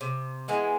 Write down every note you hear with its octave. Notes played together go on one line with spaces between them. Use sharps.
C3
E3 G#3 B3